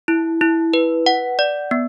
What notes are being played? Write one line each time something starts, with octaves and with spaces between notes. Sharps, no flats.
E4
E4
B4
F#5
D5
B3